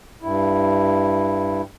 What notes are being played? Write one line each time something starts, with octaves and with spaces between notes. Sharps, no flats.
G2 E4